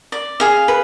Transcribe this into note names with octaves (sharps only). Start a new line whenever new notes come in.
D5
G#4 F5
B4